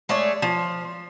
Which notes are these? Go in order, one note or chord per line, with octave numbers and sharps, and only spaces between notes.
G#3 A3 C#5 D5
F3